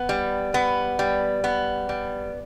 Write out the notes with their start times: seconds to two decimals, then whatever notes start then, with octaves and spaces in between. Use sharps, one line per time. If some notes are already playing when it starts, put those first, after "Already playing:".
Already playing: B3
0.09 G3
0.54 B3
0.99 G3
1.44 B3
1.89 G3